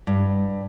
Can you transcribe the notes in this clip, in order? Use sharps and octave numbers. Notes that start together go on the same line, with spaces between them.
G2